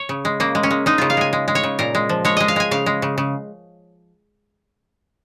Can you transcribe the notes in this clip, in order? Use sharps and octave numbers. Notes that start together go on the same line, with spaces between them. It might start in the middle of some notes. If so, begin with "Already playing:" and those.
Already playing: C#5
C#3
G#3
C#3 A#3
G#3
C#4
G#3
G#3 D#4
C#3 F4
F5
G#3 G#5
G#3
G#3
C#5
C#3
A#2 A#4
G#3
F3
G#3 C#5
G#3 D#5
F5
G#3 G#5
C#3 F5
G#3
C#3
C#3